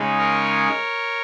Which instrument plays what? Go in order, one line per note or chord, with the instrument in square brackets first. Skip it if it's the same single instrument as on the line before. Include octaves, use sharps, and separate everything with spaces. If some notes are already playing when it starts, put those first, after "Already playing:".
Already playing: [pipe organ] C#3 G#3 D#4
A#4 C#5